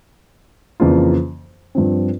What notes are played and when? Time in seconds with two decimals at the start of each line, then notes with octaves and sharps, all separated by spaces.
0.80 F2 C#3 E3 A#3 F4
1.75 G2 F3 C4